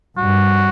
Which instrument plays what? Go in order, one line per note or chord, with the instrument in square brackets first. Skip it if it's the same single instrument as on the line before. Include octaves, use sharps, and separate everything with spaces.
[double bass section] G2 [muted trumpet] F#4